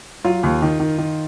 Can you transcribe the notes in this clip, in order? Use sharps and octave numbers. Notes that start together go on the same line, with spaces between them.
F#3 F4
D#2
D#3
D#3
D#3